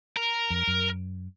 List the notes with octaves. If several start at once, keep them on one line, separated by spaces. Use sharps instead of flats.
A#4
F2
F#2